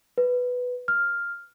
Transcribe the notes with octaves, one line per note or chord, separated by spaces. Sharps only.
B4
F6